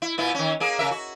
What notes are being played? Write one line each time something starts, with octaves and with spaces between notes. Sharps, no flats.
E4
A#2 B3 E4
D#3 C#4
A#3 G#4
C#3 A#4 E5
F#4